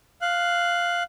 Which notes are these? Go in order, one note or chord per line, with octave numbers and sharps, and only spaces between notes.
F5 F#6